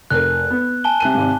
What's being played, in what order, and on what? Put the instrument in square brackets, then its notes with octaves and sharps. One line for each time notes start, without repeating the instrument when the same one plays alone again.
[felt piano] F1 A#4 [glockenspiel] F#6
[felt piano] B3
[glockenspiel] G#5 A5 G7
[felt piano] C3 F#6 D#7
G#1 C3